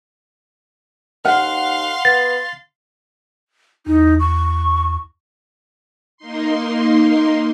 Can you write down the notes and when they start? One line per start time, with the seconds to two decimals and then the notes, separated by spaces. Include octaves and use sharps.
1.25 D#2 F5 F#5 C6 F6
2.05 B3 A6
3.86 E2 D#4
4.20 C#6
6.17 A#3 D#4 C6